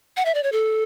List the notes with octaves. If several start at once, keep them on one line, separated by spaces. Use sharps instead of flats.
F#5
E5
D5
C#5
A4